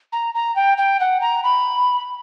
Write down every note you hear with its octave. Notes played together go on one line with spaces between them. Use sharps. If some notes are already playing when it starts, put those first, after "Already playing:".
A#5
A#5
G5
G5
F#5
A#5
B5